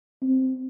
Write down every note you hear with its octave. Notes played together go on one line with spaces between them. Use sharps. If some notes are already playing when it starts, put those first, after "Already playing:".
C4